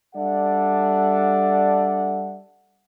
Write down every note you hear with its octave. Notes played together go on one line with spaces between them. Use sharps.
G3 D4 A4 D5 E5 F#5